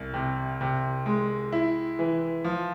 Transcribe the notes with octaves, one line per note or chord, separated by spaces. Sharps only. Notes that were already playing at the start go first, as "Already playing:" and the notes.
Already playing: C2
C3
C3
G#3
E4
E3
F3